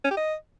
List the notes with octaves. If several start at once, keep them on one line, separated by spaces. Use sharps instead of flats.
C#4
G4
D#5